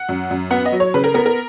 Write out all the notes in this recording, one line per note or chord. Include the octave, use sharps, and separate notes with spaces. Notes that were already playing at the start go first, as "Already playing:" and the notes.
Already playing: F#5
F#2
F#2
B3 F#5
D#5
F#3
C#5
C#3 B4
A#4
B3 A#4
A#4